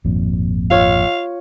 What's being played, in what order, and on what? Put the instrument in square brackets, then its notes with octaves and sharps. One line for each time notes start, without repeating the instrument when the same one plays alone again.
[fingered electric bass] G#1 F2 A#2
[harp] F4 C#5 [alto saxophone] F5